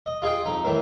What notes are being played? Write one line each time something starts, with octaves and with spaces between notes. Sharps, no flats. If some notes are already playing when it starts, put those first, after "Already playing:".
D#5
F4 G#4 D#5 G5
F2 D#4
A2 D#3 E3